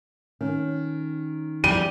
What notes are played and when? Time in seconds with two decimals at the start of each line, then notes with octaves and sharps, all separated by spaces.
0.41 D#3 C#4
1.64 F2 E3 G3 C4 D#7